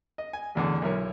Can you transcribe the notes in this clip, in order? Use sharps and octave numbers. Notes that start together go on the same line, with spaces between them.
D#5
G#5
A1 E2 D3
B1 E4 A#4 C#5